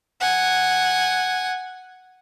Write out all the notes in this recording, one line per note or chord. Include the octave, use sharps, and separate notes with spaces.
F#5 G#5